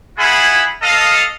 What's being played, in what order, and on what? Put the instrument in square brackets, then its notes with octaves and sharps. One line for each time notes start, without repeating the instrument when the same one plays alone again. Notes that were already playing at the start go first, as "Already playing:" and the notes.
[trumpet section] E4 F4 G#4 F#5 G#5 B5
A4 D#5 F5